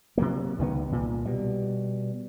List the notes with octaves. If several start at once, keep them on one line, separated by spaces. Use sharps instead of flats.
C3 F#3 A#3
C#2 D#3 E3 B3
C2 A#2
B2 G3